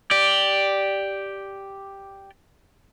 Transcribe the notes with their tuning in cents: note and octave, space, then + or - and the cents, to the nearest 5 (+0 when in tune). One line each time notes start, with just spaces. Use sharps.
G4 +0 D5 +0